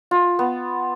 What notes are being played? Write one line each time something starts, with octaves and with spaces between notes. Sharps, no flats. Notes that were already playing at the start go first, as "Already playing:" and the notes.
F4
B3